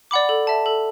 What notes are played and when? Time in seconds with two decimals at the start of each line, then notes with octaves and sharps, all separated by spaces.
0.11 D5 F#5 B5 D6
0.29 A4
0.47 E5 A5
0.66 A4